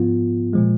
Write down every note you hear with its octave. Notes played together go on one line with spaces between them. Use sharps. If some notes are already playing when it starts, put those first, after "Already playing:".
Already playing: G#2 F3 B3 F4
A#2 F3 G#3